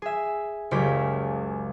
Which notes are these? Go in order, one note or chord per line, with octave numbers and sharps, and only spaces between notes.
G#4 E5
F#1 C#2 G4 B6